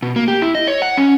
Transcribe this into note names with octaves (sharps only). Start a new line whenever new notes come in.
B2
A#3
G4
E4
D#5
C#5
F#5
C#4